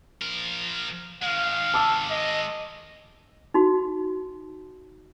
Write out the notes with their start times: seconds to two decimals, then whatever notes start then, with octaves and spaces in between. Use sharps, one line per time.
0.22 F3 A#4
1.23 D#3 G#3 F5
1.74 A5 D6 E6
2.10 D#5
3.54 D#4 F#4